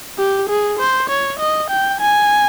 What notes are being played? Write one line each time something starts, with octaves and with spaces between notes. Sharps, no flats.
G4
G#4
C5
C#5
D#5
G5
G#5